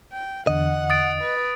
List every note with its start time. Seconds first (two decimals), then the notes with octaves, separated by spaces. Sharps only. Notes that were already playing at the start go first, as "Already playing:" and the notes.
0.13 G5
0.47 E2 D3 D#5 F#5
0.90 D#6 A6 D7
1.22 B4